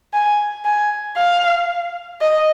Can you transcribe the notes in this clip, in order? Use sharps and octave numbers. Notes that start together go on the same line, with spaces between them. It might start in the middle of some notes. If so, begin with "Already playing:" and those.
G#5
G#5
F5
D#5